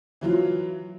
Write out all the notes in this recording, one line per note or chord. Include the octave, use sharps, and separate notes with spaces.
E3 F#3 F4